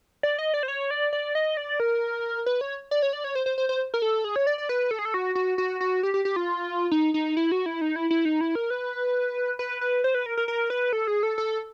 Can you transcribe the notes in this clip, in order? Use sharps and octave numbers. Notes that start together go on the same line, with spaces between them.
D5
D#5
D5
C5
C#5
D5
D5
D#5
D5
A#4
B4
C#5
D5
C#5
D5
C#5
C5
C5
C5
C5
A#4
A4
G#4
C#5
D5
D5
B4
A4
G#4
A4
F#4
F#4
F#4
F#4
G4
G4
G4
F4
D#4
D#4
E4
F#4
E4
D#4
E4
E4
D#4
E4
A#4
B4
B4
B4
C5
B4
A#4
A#4
A#4
B4
A4
G#4
A4
A4